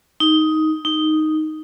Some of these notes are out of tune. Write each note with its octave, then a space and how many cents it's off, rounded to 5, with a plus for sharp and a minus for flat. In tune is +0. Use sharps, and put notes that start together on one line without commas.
D#4 +10
D#4 +0